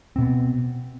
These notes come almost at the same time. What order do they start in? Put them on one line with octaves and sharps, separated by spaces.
C4 B2 B3